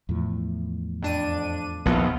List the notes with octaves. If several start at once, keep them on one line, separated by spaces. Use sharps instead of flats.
E2 A2 F3
F2 D4 D#7
A#1 D#2 B3 F4